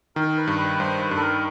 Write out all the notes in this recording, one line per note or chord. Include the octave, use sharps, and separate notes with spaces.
D#3 A#4
B4
G2
B4
G2 C5
B4
G2
A4
A#4